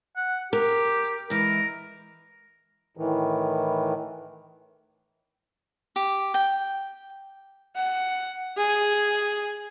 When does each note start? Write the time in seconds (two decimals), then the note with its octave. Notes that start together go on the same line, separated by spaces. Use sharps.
0.16 F#5
0.53 G4 A#4
1.30 E3 G#3 A#4
2.97 A2 D#3 E3
5.96 G4
6.34 G5
7.76 F#5
8.57 G#4